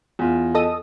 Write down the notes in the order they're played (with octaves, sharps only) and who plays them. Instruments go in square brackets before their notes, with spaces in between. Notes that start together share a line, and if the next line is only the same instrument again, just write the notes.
[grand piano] E2 F4
[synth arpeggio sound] A4 D#5 D#6